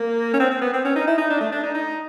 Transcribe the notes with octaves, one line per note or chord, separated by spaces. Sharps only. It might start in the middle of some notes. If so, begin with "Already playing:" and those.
Already playing: A#3
C#4
C4
C4
B3
C4
C#4
D#4
E4
D#4
D4
A3
D4
D#4
D#4